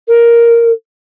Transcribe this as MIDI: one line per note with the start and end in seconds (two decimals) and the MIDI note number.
0.08 0.71 70